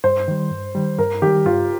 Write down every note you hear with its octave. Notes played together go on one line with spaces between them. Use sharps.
G2 C5
D#3 G3
G2
D#3 G3
G2 A#4
D#3 G3 G4
G2 F4